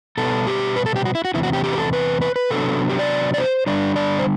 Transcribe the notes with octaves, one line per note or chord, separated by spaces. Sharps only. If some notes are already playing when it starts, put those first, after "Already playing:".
B2 G3 B3 A4
G4
B4
A4
G4
F#4
E4
F#4
E2 C3 E3 E4
F#4
G4
G4
B4
A4
B4
B4
B4
C3 F#3 B3 D4 A4
G4
D5
D5
C5
D3 G3 D4 D5
D5
C5